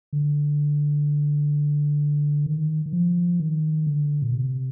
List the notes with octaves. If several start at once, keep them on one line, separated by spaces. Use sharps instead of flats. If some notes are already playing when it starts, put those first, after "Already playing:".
D3
D#3
D#3
F3
D#3
D3
A#2
C3